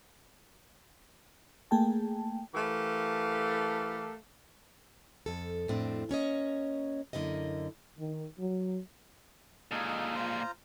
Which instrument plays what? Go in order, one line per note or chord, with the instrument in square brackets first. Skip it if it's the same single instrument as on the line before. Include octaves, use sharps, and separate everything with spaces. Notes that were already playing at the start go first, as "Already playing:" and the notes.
[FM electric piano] A3 A#3 G#4 G5 A5
[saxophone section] E3 A3 G4 A4 A#4 F5
[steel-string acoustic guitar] F2 A4
F2 A2 C4 D4
A#3 C#4 C#5 D#5
F#2 D3 A#3 E4 D#5
[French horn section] D#3
F#3
[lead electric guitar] A#2 G#3 [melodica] D#4 A4 F5
[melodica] F4 C5 A#5